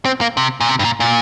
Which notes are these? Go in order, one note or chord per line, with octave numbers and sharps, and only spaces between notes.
C4
A#3
C3
A#2
C3
G2
A#2
A#2